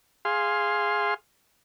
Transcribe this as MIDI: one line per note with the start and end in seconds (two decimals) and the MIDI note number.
0.25 1.14 68
0.25 1.14 77
0.25 1.14 84